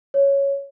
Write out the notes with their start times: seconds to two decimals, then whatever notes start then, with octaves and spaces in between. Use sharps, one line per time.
0.14 C#5